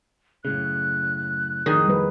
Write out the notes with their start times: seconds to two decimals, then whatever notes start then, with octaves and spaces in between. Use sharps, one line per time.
0.45 F#2 A2 C#3 F#6
1.66 F2 A2 D#3 G#4 G#5
1.85 G3 B4